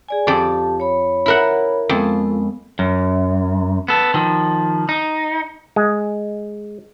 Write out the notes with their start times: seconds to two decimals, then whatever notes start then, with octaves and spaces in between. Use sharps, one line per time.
0.09 G#4 D5 G#5
0.27 F2 G4 D5 A5
0.80 C#5 B5
1.26 E4 A#4 F#5
1.89 F2 G#3 B3
2.79 F#2
3.88 B3 A4
4.14 D#3 F3
4.89 D#4
5.76 G#3